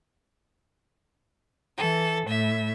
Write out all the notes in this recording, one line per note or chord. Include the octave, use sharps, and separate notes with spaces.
E3 A4
A2 E5